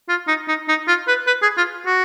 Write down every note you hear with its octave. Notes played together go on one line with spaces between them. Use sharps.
F4
D#4
D#4
D#4
F4
B4
B4
G#4
F4
F#4